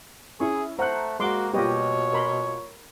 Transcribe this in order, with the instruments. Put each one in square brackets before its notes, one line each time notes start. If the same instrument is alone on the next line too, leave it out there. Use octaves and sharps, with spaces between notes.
[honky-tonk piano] C#4 E4 [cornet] G#4 [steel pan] C#6
[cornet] A3 [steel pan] C5 F#5 [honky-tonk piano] A#5 F#6
[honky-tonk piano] G#3 F#5 [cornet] A#3 [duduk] F#4 [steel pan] D#5 C6 D6
[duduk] B2 [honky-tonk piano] G3 A#3 F4 [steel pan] G4 B4 D#5 [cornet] C#5
[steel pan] A#4 B5 C6